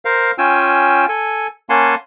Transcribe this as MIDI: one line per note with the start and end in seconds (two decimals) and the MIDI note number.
0.05 0.32 70
0.05 0.32 72
0.05 0.32 77
0.38 1.05 61
0.38 1.05 65
0.38 1.05 79
0.38 1.05 80
0.38 1.05 88
1.09 1.47 69
1.09 1.47 80
1.69 1.95 58
1.69 1.95 61
1.69 1.95 78
1.69 1.95 80
1.69 1.95 81
1.69 1.95 84